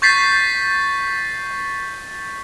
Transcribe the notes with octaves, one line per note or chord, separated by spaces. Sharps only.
C#6 G6 A6 B6 C7